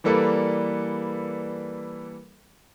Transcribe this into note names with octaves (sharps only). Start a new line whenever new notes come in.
E3 G3 A#3 A4 B4 D5